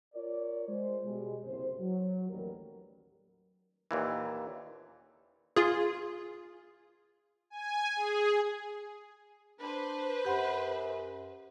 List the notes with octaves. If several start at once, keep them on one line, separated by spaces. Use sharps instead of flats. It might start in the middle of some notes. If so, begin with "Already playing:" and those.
F4 A#4 C#5 D5
G#3 C5
B2 G3 G#3
F#1 C2 C5
F#3
A1 D#2 D#3 G3 A#4
D#2 A#2 E3
F4 G#4
G#5
G#4
D4 B4 C5
F#2 G4 F#5 B5